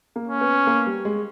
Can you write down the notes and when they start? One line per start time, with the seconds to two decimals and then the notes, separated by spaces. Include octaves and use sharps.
0.16 A#3
0.28 C#4
0.41 B3
0.67 A#3
0.86 G3
1.05 G#3